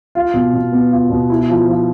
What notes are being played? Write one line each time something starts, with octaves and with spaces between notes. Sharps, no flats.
F4
B2
B2
B3
F4
B2
E4
F3
F3